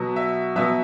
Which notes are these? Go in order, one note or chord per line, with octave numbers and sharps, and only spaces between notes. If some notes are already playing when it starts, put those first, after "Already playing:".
Already playing: B2 F#3 B3
E5
B2 F#3 B3 E5